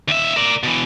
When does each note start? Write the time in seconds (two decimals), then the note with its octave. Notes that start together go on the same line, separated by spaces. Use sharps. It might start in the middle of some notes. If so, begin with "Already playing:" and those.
0.08 D#2 E5
0.36 A#4 D5
0.63 B2 E3